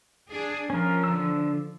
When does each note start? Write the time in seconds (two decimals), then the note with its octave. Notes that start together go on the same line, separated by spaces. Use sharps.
0.30 D4 G#4
0.70 F3 C#4 A#4
1.04 D3 E6